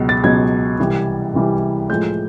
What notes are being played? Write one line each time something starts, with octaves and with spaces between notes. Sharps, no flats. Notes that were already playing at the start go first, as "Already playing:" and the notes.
Already playing: C#2 B2 F#3
A6
C#2 B2 F#3 G#6
C2 C3 E3 G3
C2 C3 E3 G3
A2 F3 G#3 G6